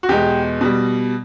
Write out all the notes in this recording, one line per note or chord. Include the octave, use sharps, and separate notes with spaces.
F#4
E2 B2 G#3 G4
B2 G3